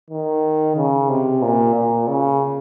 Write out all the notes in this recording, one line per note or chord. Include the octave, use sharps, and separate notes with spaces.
D#3
C#3
C3
A#2
A#2
C#3